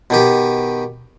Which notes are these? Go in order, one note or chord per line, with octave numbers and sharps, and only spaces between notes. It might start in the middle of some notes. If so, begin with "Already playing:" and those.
B2 D#3 G4